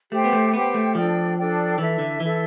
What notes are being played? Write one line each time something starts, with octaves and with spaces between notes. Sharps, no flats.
A3 G4 C5 G5
B3
A3
B3 G4 C5 G5
A3
F3 D4 A4 D5 G5
D4 A4 D5 G5
E3 E4 A4 E5
D3
E3 E4 A4 E5